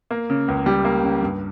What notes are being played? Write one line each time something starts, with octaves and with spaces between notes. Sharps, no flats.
A#3
C#3
C#2
G3
A#3
C#3
G2